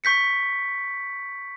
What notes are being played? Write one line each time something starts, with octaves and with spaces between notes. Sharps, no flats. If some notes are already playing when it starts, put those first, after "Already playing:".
C#6 G6 B6 C#7